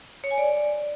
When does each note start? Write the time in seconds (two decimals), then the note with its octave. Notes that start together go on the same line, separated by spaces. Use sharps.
0.24 C#5
0.31 G#5
0.38 D5